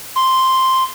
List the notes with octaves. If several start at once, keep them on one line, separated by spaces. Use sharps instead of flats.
C6